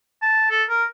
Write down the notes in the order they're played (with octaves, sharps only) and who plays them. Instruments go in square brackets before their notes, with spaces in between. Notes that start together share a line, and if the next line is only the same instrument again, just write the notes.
[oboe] A5
A4
A#4